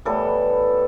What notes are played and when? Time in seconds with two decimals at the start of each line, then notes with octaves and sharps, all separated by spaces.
0.05 A2 E3 G3 B3 A4